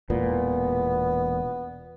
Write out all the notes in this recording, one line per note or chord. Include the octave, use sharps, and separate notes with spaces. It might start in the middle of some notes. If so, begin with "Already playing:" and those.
E1 E2 A#2 B3